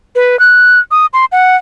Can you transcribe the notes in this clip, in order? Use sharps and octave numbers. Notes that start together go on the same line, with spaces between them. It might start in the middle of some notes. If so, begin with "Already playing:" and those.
B4
F#6
D#6
C6
F#5